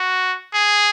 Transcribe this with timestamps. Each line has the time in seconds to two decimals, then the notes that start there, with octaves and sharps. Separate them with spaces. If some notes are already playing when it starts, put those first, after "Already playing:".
Already playing: F#4
0.54 G#4